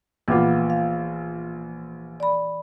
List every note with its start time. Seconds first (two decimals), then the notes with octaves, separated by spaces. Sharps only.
0.28 A#1 E3 B3 F4 D6
0.70 F5
2.20 D5 B5